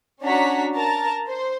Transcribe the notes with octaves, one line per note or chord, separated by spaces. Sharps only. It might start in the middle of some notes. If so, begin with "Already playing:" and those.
C#4 D4 F#4 A#5 B6
A#4 A5 A#5
C5